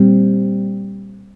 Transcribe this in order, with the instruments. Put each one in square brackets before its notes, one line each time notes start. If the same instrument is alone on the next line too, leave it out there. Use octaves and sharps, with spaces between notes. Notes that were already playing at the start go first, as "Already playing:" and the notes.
Already playing: [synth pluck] A#2 G3 C4